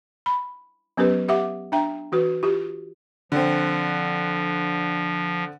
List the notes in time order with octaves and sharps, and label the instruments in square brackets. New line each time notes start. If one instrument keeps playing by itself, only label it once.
[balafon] B5
F#3 B3 C#4 G4 A#4 B4
G4 E5 F#5 D6
D4 E5 G5 A#5
E3 F#4 B4
F4 G4
[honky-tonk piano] D3 C4 [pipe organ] F3